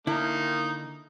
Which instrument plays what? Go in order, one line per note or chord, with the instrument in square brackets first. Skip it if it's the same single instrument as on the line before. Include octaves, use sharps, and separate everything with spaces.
[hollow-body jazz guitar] D3 E4 [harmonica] A#3 D#4